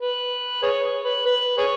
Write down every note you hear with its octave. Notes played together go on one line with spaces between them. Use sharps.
B4
G#4 C#5
B4
B4
G#4 C#5